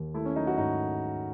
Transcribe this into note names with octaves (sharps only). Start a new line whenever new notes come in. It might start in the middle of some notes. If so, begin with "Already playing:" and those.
Already playing: D#2
A3 E4
C#4
F#3 D#4
F#4
G#2 D#4